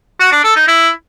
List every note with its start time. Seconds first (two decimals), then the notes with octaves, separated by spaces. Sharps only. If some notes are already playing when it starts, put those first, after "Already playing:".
0.20 F#4
0.32 D4
0.44 A4
0.56 D#4
0.68 E4